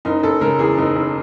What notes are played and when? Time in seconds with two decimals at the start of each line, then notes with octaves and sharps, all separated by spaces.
0.05 F#1 D#4
0.23 F#1 A4
0.41 C#3 A#4
0.59 E2 G#4
0.77 F#1 D#4
0.96 F#1